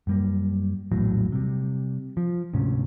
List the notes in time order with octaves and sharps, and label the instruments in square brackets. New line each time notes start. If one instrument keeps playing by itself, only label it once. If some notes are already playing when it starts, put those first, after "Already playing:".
[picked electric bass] F#2 G3 A#3
A#1 E2 A2 F#3
C3 G3
F3
D2 G#2 C3 C#4